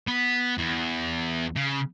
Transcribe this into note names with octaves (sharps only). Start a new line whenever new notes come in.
B3
E2
C#3